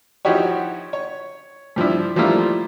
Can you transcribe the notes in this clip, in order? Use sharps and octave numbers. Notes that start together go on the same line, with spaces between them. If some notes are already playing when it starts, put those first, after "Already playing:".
F3 D#4 E4 F#4 G4 C#5
C#5
G2 F3 D4 E4
F3 G3 A3 A#3 E4 F4